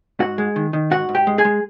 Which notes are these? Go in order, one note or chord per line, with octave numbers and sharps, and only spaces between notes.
G#2 F#4 F#5
G#3
D#3
D#3
G#2 F#4 F#5
G#2
G4 G5
G#3
G#4 G#5
G#3